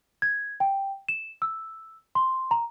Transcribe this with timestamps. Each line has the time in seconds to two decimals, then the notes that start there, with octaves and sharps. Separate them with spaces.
0.22 G#6
0.60 G5
1.09 E7
1.42 E6
2.15 C6
2.51 A#5